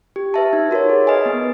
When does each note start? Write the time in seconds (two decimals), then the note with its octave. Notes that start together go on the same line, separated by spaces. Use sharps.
0.16 G4
0.34 B4 E5 A5
0.53 D#4
0.71 F#4 A#4 C#5
0.89 G#4
1.07 B4 D#5 G#5
1.26 B3